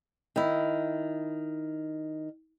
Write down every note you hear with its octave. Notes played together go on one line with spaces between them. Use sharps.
D#3 E4